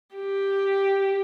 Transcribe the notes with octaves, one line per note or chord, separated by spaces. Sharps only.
G4